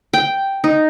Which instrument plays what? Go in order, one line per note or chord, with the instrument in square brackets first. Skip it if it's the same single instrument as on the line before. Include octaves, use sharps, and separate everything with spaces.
[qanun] G5
D#4